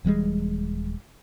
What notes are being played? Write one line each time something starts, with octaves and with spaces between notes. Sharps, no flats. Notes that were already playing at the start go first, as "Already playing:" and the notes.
D#1 E3 G3 G#3